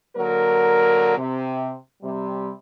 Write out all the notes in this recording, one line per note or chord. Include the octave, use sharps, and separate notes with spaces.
D3 F#3 A#3 A#4
C3
C3 G3